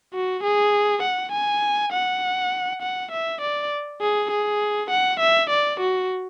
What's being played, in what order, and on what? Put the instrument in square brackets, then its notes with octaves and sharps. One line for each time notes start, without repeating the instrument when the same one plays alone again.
[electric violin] F#4
G#4
F#5
G#5
F#5
F#5
E5
D5
G#4
G#4
F#5
E5
D5
F#4